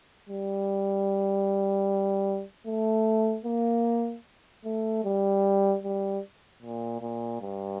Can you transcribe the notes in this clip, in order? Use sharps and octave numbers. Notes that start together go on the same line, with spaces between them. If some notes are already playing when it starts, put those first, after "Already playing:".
G3
A3
A#3
A3
G3
G3
A#2
A#2
G2